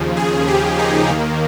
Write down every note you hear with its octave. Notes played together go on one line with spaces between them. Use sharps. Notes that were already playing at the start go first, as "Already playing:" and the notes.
Already playing: D#2 C#3 F3
G#4
G4
D#4
D#2 D#3 A#3